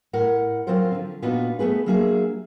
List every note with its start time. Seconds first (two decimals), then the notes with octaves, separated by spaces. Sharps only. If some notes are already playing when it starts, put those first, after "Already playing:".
0.13 A2 A#4 F#5
0.67 F#3 C4 C#4 F4 A#4 C5
0.92 D3 F3
1.22 A#2 B3 D4 D#4 F4 F#4
1.59 A3 B3 G#4 B4
1.86 F#3 G3 A#3 D4 G#4 E5